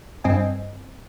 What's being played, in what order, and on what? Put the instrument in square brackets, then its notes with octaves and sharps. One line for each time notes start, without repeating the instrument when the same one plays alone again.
[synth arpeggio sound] G2 C4 D#5 G#5